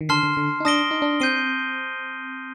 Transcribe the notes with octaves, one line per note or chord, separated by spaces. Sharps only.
D#3
D3 A5 C6 F6 C7
D3
D3
D#4
D4 A5 D#6 A#6 D7 G7
D#4
D4
C4 G6 C7 D#7 G7